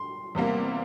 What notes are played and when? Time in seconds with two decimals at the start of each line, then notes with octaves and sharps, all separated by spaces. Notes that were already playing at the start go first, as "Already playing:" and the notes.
Already playing: C6
0.35 E2 C3 G3 A#3